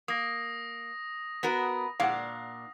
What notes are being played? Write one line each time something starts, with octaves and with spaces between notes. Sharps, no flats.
A#3 D#6 A#6
B3 F#4 A#4
A#2 D4 F5 F#5